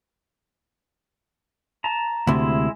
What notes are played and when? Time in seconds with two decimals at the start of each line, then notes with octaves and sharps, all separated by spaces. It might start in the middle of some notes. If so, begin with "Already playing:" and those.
1.84 A5 A#5
2.27 D2 C3 G#3 E4